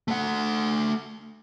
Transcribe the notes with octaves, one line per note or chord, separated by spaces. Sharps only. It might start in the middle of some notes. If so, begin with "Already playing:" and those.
A3 F#5